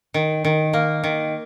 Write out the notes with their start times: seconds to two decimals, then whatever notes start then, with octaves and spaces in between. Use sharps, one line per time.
0.14 D#3
0.45 D#3
0.73 A#3
1.04 D#3